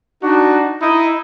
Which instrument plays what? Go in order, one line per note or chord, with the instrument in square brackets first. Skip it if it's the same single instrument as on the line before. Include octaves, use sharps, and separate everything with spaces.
[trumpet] D4 [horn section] D#4 F#4
[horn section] D#4 D#5 [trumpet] E4